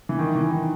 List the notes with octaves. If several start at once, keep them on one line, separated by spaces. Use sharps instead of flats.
E3
D#3
E3
D#3